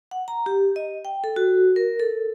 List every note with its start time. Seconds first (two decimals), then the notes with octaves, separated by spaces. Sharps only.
0.11 F#5
0.28 A#5
0.46 G4
0.76 D#5
1.05 G5
1.24 A4
1.36 F#4
1.76 A#4
2.00 A4